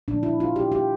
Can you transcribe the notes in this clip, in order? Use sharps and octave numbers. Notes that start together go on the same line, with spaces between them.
A#2 F3 A3 D4
E4
F4
G4
G4